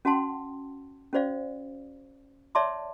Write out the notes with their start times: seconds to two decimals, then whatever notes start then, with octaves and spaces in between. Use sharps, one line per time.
0.05 C#4 F#4 F#5 G5 A5 C6
1.13 C#4 F#4 C5 D5 F5
2.55 C#5 D5 E5 A5 C6 D6